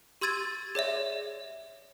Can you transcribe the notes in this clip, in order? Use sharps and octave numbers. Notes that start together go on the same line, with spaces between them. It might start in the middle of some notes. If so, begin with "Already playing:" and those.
G4 C6 E6 G#6 A6 D#7
G#4 C#5 D5 E5